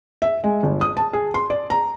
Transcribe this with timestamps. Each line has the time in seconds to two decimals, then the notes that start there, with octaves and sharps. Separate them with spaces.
0.22 E5
0.44 G#3
0.63 G1
0.81 D#6
0.97 A5
1.13 G#4
1.34 C6
1.50 D5
1.70 A#5